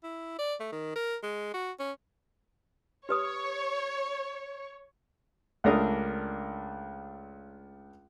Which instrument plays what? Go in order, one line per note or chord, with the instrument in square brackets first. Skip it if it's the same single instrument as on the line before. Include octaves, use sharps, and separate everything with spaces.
[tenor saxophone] E4
D5
A3
D#3
A#4
G#3
F#4
C#4
[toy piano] G4 B4 D#6 [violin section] C#5
[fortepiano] C#2 A3 D4 A#4 F5 D#6